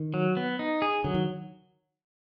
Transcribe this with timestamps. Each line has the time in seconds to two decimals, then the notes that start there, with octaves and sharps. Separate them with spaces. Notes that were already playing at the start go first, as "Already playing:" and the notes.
Already playing: D#3
0.14 F#3
0.37 B3
0.59 D#4
0.82 G#4
1.04 D3 F#3
1.14 D#3